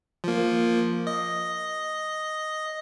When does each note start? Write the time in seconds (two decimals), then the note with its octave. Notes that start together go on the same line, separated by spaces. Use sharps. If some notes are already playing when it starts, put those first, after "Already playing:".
0.24 F3 A#3
1.07 D#5